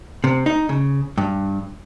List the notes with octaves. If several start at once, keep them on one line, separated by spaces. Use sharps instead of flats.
C3
D#4
C#3
G2